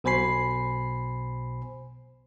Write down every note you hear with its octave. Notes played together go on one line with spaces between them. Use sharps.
B1 B2 C5 G#5 B5 C7